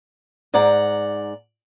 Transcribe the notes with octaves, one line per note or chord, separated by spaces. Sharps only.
G#2 D5 F#5 A#5